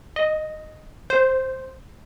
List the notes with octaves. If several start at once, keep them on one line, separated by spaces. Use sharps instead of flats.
D#5
C5